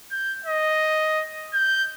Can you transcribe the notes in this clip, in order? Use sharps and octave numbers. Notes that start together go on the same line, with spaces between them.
G6
D#5
G6